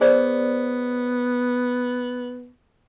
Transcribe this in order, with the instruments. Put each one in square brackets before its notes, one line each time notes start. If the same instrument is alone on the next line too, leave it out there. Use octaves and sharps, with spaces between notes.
[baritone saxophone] B3 [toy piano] G#4 C5 D5